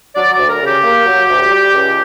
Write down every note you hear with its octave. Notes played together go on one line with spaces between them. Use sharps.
F#3 D5
D5
D2
A#4
C#3
G4
A#3
F#3
D2
G3
C#2